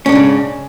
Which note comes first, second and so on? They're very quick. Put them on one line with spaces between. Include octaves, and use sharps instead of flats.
C#4 D4 C#3 G#2